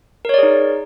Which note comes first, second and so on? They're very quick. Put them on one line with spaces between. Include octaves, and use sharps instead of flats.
A#4 C#5 D5 G#4 D#4